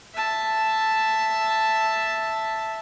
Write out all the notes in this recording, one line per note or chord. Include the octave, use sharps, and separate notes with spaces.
E5 A5